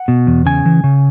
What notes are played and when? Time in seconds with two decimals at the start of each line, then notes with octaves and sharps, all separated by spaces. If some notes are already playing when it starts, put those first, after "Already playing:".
Already playing: F#5
0.08 B2
0.27 E2
0.46 C#3 G#5
0.66 E3
0.84 C#3